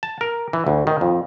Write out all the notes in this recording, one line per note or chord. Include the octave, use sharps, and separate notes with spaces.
A5
A#4
E3
D2
D#3
F2